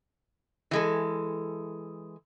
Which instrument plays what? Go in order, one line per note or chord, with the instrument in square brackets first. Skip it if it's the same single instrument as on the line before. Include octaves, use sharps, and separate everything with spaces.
[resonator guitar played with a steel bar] E3 G#3 A4